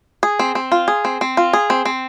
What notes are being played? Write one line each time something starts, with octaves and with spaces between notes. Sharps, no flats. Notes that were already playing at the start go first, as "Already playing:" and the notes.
G#4
C4
C4
F4
G#4
C4
C4
F4
G#4
C4
C4